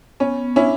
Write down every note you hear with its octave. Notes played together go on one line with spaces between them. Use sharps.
B3 C#4
C#4 D4 E4